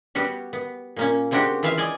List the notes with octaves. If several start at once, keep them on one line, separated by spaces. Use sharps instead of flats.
G3 B3 F#4 G4
B3
A#2 A#3 C#4
C#3 G3 C4 D4 F#4 G4
E3 F4 B4 E5 F5
D5 D#5 G#5